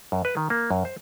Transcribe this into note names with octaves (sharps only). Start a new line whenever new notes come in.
F#2
B4
D#3
A#3
F#2
C5